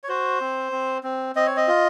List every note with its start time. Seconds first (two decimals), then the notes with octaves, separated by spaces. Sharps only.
0.04 C#5
0.09 F#4 C5
0.41 C4
0.72 C4
1.03 C4
1.36 C4 D#5
1.46 C#5
1.57 D#5
1.68 F4